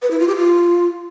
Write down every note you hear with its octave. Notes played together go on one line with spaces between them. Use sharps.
B4
E4
F4
G4
F4